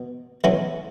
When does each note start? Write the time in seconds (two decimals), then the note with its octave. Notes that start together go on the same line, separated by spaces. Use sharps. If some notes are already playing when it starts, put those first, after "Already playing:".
Already playing: B2
0.44 B1 B2 F#3 C#4 E4